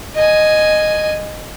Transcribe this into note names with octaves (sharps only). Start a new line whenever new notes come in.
D#5 G#5